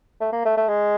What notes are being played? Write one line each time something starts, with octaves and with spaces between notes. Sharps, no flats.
A3
A#3
A3
A3
G#3